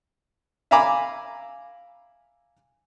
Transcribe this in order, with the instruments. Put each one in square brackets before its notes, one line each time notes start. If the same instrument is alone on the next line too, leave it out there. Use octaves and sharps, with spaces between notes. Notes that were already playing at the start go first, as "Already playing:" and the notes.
[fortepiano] E5 F5 G#5 A#5 B5 D6